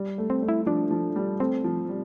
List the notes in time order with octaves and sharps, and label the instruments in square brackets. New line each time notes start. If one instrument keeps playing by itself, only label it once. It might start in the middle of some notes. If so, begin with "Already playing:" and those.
Already playing: [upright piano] G3
A3
[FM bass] C4
[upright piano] A3
[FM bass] E4
[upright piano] F3 [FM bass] D4
[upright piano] F3
G3
[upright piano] A3 [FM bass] C4
[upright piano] F3
G3